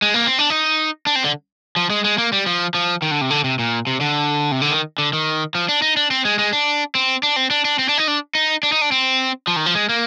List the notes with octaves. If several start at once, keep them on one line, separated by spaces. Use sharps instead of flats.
G#3
A#3
C4
D4
D#4
D4
C4
D3
F3
G#3
G#3
A#3
G3
F3
F3
D#3
D3
C3
D3
C3
A#2
C3
D3
C3
D3
D#3
D3
D#3
F3
D4
D#4
D4
C4
G#3
G#3
D4
C4
D4
C4
D4
D4
C4
D4
D#4
D4
D#4
D4
D#4
D4
C4
F3
D#3
F3
G#3
A#3